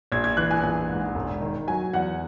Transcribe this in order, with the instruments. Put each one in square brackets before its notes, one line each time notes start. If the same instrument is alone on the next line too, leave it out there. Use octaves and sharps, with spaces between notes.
[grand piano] A#1 [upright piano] G#6
[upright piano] G#6
[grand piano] E3 [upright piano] F#6
[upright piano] G#5
[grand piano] A#1 [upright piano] G#5
[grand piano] G#2
E1
D#3
[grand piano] F#3 [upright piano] G#5
[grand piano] E2 [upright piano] F#5